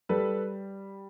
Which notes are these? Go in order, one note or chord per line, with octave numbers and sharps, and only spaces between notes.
G3 A4 B4